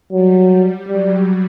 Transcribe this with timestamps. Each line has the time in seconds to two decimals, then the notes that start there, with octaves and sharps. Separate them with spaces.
0.12 F#3 G3
0.88 F#3 G3